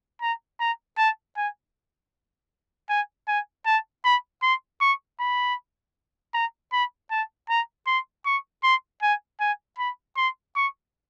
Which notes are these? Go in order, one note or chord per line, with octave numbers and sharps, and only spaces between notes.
A#5
A#5
A5
G#5
G#5
G#5
A5
B5
C6
C#6
B5
A#5
B5
A5
A#5
C6
C#6
C6
G#5
G#5
B5
C6
C#6